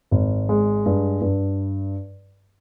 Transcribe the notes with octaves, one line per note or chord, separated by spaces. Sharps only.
G#1
G#3
G2
G2